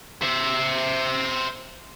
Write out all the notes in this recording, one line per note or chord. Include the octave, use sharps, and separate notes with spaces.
C5 E5